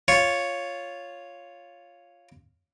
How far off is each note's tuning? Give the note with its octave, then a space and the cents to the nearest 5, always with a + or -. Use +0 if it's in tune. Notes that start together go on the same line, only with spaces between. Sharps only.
F4 +0 C#5 +0